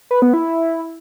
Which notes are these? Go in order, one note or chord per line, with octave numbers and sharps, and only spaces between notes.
B4
B3
E4